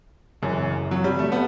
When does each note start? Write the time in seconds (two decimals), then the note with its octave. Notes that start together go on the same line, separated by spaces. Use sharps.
0.42 F#1 F#2 E3
0.91 F#3
1.04 G3
1.19 A3
1.32 B3